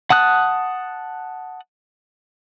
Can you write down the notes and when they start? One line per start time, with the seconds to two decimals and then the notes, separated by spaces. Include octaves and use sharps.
0.10 F#5 A5 D#6 F#6